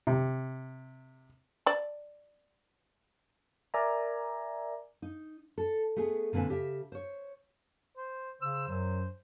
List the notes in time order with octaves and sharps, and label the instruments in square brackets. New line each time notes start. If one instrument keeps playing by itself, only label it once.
[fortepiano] C3
[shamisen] D5 A5
[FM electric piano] A#4 D5 E5 G#5 A#5
[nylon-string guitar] D#4
A4
A3 B3 G#4
A#2 D3 C4 B4 G#5
C#3 G4 D5 E5
C5 C#5
[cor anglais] C5
[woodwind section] C#3 E6 [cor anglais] C5
[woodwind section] F#2 F#3